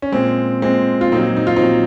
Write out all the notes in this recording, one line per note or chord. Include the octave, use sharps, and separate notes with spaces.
C#4
A#2 G#3 C4
A#2 G#3 C4
F4
A#2 F#3 C4 D#4
D#4
F4
C4 D#4
A#2 F#3